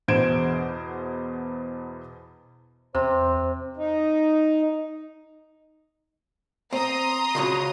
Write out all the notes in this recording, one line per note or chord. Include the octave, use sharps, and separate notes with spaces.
E2 B2 C5 G#6 D7 E7
E2 C3 C5
D#4
C4 A#5 C6 D#6
C#2 C#3 F#3